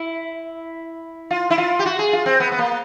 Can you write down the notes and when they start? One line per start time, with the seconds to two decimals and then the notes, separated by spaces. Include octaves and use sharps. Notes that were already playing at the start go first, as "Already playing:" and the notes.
Already playing: E4
1.31 F4
1.50 E4
1.58 F4
1.79 G4
1.86 F#4
1.99 G#4
2.13 F4
2.26 C4
2.40 B3
2.52 B3
2.59 A#3